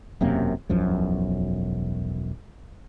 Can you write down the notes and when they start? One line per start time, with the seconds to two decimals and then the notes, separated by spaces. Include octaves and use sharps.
0.21 E1 F#2 C3 A#3
0.69 E1 B1 F#2 F3